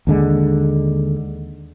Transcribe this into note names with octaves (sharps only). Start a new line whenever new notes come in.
D#2 D3 G#3